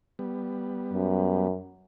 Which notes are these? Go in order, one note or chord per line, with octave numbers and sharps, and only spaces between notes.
G3 B3
F#2